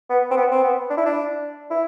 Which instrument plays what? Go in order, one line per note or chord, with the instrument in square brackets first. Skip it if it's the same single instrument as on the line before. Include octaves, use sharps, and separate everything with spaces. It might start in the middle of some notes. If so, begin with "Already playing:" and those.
[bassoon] B3
C4
B3
C4
B3
D4
E4
D4
E4